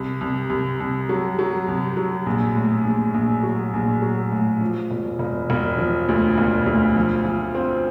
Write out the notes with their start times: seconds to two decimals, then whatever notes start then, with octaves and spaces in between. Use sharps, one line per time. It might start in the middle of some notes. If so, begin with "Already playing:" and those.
Already playing: C2
0.21 C2
0.50 C2
0.80 C2
1.09 F#3
1.39 F#3
1.68 C2
1.97 F#3
2.26 A#1
2.56 A2
2.84 A#1
3.14 A#1
3.43 F#3
3.74 A#1
4.02 F#3
4.32 A2
4.61 F3
4.90 E1
5.19 E1
5.50 E1
5.78 F3
6.09 D2
6.38 E1
6.66 D2
6.96 F3
7.25 F3
7.55 C4